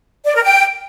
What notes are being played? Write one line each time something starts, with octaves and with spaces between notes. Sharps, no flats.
D5
A#4
G5